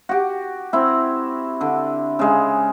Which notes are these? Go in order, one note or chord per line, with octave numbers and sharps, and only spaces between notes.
F#4 G4
C4 E4
D3
C#3 G#3